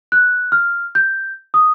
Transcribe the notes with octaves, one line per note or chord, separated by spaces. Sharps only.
F#6
F6
G6
D#6